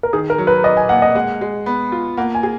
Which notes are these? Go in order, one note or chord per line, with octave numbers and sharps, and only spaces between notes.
A#4
D#3 G#4
A#4
F#3
B4
D5 D#5
G#5
A#3 F#5
D#5
G#3 F#5
G#3
B3
F4
A#3 F#5
G#5
G#4